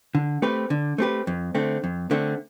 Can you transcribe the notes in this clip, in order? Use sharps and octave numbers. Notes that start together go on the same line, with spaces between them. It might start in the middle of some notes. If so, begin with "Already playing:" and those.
D3
A3 C4 G4 B4
D3
A3 C4 G4 B4
F2
D3 A3 C4
F2
D3 A3 C4